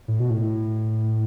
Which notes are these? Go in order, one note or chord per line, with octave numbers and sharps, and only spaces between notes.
A2
B2
A2
A2